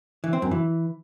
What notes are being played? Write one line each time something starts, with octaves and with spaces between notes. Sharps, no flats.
E3
C4
F#2
E3